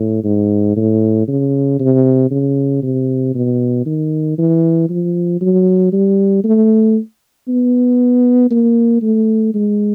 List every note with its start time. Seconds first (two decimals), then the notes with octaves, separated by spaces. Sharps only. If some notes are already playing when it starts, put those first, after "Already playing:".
Already playing: A2
0.24 G#2
0.76 A2
1.28 C#3
1.79 C3
2.31 C#3
2.83 C3
3.34 B2
3.86 D#3
4.38 E3
4.89 F3
5.41 F#3
5.92 G3
6.44 A3
7.48 B3
8.50 A#3
9.02 A3
9.54 G#3